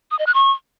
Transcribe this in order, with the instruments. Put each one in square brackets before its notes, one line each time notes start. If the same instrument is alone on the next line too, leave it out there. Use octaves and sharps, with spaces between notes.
[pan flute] D#6
D#5
F#6
C#6